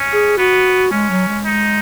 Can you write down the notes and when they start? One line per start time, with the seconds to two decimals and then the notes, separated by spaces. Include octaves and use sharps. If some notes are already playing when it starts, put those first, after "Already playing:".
Already playing: C#4
0.12 G#4
0.38 B3 F#4
0.92 G#3 C#4
1.10 F#3
1.28 G#3
1.45 D#4